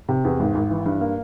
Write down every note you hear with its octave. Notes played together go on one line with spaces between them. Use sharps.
C3
E2
G#1
G#1
E3
G2
A#3